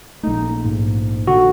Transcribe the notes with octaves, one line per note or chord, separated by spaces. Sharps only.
A#1 A3 D#4
G#2
D3 F#4